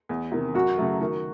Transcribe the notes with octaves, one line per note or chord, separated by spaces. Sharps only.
E2
C3 D#3
F#2 F#4
C#3 F#3 A3
D#3